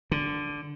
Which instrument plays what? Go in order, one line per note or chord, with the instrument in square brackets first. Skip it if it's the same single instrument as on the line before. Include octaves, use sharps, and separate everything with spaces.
[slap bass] D3